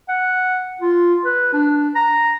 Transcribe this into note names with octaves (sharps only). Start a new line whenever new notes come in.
F#5
F4
B4
D4
A#5